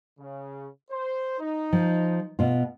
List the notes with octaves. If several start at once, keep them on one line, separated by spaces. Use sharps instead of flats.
C#3
C5
D#4
F3
B2 F4